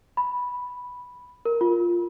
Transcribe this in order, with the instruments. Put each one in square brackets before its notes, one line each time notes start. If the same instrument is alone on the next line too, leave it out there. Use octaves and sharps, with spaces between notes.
[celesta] B5
A#4
F4